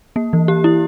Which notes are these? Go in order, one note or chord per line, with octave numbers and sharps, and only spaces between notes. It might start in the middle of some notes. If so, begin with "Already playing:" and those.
A#3
E3
G4
E4